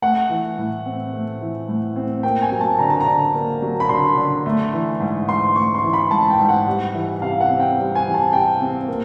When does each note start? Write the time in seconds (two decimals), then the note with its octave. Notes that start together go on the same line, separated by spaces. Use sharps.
0.02 A3 F#5
0.30 E3
0.58 A2
0.85 C4
1.13 A3
1.41 E3
1.68 A2
1.96 C4
2.23 A#3 G5
2.42 G#5
2.52 F#3
2.61 A5
2.79 D3 A#5
2.90 A5
3.00 A#5
3.07 D3
3.34 A#3
3.62 F#3
3.80 B5
3.89 D3 C6
4.17 D3
4.46 A3
4.73 E3
5.00 G#2
5.28 G#2 C6
5.56 A3 C#6
5.74 C6
5.83 E3
5.93 B5
6.11 G#2 A5
6.30 G5
6.40 G#2
6.49 F#5
6.67 G3
6.94 E3
7.22 C3 F5
7.40 F#5
7.49 C4
7.60 G5
7.78 G3
7.95 G#5
8.05 E3
8.14 A5
8.33 C3 G5
8.61 C4
8.88 A#3